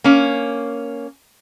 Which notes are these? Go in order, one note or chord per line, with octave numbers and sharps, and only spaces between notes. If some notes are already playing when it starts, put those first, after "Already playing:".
A#3 C#4